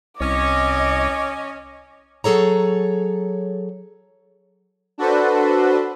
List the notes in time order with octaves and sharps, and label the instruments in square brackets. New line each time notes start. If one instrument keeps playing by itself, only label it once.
[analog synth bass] C2 [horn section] C#4 C#5 [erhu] D#5 [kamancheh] D6
[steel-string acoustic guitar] F#3 G#4 A4 C#5 A#5
[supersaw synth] D4 F#4 A4 B4 C5